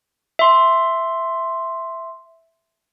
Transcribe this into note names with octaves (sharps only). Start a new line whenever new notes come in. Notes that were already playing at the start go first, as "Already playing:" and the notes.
E5 C6